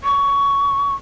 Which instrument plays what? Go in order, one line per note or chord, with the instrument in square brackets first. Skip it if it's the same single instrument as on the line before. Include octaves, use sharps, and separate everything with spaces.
[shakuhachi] C#6